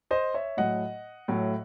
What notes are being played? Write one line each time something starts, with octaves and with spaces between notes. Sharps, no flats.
C5 D#5
C#5 E5
A2 F#3 A3 D#5 F#5
A2 F#3 A3